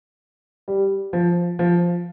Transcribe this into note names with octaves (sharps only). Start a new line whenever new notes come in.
G3
F3
F3